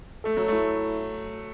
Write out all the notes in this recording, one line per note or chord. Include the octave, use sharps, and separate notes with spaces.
A3 A4
F#3
A3 E4